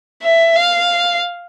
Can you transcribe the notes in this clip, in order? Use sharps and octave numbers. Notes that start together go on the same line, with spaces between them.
E5
F5